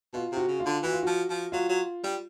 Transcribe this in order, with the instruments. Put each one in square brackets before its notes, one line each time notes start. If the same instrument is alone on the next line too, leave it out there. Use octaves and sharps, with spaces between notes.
[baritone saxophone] B2 [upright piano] F4
[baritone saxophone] C3 [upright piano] F#4
[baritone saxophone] C#3
[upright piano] F4
[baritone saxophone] D3
[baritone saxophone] E3 [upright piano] F#4
[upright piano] F4
[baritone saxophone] F3 [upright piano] F#4
[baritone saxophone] F3
[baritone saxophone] F#3 [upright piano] F4
[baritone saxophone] F#3
G3